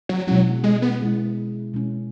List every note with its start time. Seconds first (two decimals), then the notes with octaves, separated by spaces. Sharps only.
0.09 F#3
0.27 B2 F#3 G#3 C#4 E4
0.64 G#3
0.82 B3
1.01 B2 G#3 C#4 E4
1.73 B2 G#3 C#4 E4